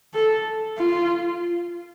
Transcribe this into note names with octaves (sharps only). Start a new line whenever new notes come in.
A4
F4